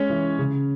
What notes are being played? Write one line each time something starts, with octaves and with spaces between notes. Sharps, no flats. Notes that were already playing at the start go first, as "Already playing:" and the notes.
Already playing: G#3 C#4 C#5
E3
C#3